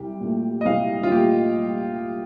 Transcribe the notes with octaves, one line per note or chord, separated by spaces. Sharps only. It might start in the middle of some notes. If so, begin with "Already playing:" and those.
Already playing: C2 G4
A#2 A3
D#5
C2 F5
F4
A#2 A3 G4